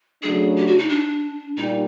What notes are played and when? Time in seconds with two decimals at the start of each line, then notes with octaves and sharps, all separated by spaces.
0.22 C#3 F#3 A3 D4 G#4
0.56 G4
0.67 F#4
0.78 D#4
0.89 D4
1.56 A#2 G3 D#4